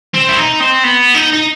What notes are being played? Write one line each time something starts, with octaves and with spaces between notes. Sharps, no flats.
C4
E4
D#4
C4
B3
D#4
D#4